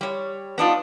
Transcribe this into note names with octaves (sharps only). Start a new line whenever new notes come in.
G3 C#5
B3 D4 D#4 F4